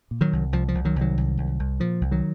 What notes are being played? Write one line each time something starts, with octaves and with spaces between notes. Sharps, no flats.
A#2
D#3 F#3
C2
C2 F3
F3
C2
D#3 F#3
C2
D#3 F#3
C2
C2
C2
A#2 F3
C2
D#3 F#3